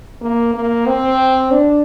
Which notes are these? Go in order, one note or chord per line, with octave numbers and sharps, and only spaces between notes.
A#3
A#3
C4
D4